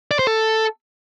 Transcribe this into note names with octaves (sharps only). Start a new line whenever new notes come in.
D5
C5
A4